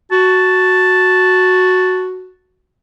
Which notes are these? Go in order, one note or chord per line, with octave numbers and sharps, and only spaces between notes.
F#4 A5